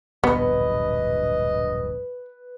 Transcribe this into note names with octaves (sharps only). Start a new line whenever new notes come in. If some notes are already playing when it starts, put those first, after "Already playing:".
D1 A#1 G2 B3 B4 D#5